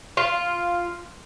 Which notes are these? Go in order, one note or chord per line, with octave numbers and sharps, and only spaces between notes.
F4